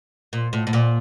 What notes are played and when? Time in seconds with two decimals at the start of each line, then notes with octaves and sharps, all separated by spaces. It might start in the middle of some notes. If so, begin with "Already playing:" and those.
0.33 A#2
0.53 A2
0.67 A2
0.73 A#2